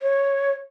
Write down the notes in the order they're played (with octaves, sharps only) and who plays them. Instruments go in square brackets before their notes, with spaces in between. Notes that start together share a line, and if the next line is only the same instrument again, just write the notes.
[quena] C#5